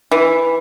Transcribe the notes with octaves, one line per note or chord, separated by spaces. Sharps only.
E3